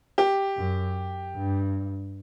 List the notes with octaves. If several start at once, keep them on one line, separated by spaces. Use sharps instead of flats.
G4
F#2
G2